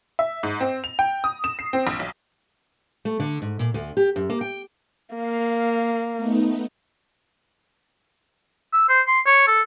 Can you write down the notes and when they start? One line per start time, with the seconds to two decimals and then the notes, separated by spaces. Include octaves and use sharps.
0.19 E5
0.43 G#2
0.60 C4
0.84 F7
0.99 G5
1.24 D#6
1.44 E7
1.59 C7
1.73 C4
1.87 A#1
1.99 B1
3.05 A3
3.20 D3
3.42 G#2
3.59 A#2
3.74 D2
3.97 G4
4.16 F#2
4.30 A#3
4.41 G5
5.15 A#3 F5
6.16 A3 B3 D#4
8.73 E6
8.89 C5
9.07 C6
9.26 C#5
9.47 A4